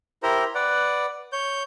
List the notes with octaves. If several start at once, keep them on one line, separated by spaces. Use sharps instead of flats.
E4 G4 A#4 C5 A#5
B4 D5 F#5
C#5 G6